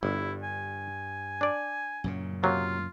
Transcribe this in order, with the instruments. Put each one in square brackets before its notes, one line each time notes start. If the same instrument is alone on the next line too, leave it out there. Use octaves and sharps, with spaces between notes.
[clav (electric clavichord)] G1 [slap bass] G2 [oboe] E4
[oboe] G#5
[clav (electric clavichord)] D4 D5
[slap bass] F#2 A#2 C#3
[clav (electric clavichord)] C3 F#3 A#3 [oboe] F4